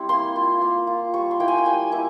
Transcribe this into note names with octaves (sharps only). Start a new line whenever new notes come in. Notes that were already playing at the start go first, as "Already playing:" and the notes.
Already playing: G3 C4 E4
A#3 C6
F4
A#3
F4
G3 C#6
C6
A#3 E4 G5
G#5
G5
G3 G#5
A#3 E4